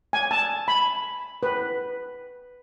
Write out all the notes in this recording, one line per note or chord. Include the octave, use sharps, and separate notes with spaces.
G#5
A5
B5
B4